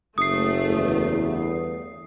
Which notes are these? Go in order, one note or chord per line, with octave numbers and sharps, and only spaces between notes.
F#1 A3 D#6 C7
G1 E2